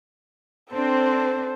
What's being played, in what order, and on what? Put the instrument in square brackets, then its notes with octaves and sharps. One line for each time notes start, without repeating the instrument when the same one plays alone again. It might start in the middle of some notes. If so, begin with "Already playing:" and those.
[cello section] C4 D4 [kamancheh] A4 C5